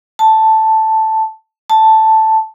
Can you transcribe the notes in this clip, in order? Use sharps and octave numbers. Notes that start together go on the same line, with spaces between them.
A5
A5